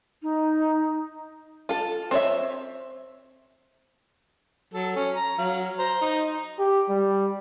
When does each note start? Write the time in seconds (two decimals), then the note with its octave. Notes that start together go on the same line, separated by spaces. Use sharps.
0.23 D#4
1.69 F4 A4
2.11 C4 C#5 E5
4.74 F#3 A4
4.96 C#4
5.15 A#5
5.38 F#3 F5
5.78 C5 A#5
6.01 D#4
6.59 G4
6.89 G3